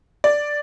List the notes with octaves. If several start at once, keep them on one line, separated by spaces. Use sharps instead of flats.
D5